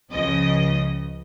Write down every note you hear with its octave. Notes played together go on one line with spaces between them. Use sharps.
C#2 C#3 F3 D#5